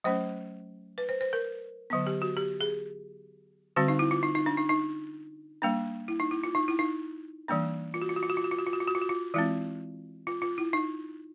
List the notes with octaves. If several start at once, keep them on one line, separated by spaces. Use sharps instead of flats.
F#3 A3 C#4 C5
B4
C5
C5
A#4
D3 F#3 B3
G4
F#4
G4
G#4
D3 G3 C4 F#4
D#4
E4
F4
D#4
D#4
D4
D#4
D#4
G3 A#3 D4
E4
D#4
E4
F4
D#4
E4
D#4
E3 G3 A#3 D4
F4
F#4
F4
F#4
F4
F#4
F4
F#4
F4
F#4
F4
F#4
F4
F#4
F4
F#4
F4
E3 G#3 C4 E4
F4
F4
E4
D#4